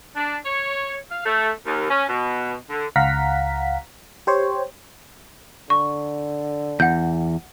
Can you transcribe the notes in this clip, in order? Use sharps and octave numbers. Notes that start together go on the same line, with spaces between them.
D4
C#5
F5
A3
D#2
C#4
B2
D3
C#2 F5 F#5 A#5 B6
G4 C5 C#5
D3 C#6
E2 F#5 G6